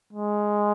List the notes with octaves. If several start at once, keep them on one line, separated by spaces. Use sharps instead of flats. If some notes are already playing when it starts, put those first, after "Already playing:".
G#3